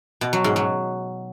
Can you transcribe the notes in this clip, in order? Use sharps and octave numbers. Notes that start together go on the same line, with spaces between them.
B2
F#3
G#2
F#3